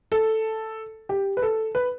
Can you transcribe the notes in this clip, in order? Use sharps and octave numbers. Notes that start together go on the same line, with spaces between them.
A4
G4
B4
A4
B4